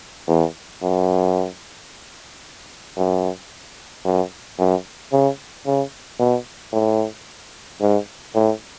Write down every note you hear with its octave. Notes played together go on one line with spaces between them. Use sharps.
E2
F#2
F#2
F#2
F#2
C#3
C#3
B2
A2
G#2
A2